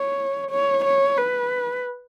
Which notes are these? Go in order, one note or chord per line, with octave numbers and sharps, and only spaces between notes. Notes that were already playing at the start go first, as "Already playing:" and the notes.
Already playing: C#5
C#5
C#5
B4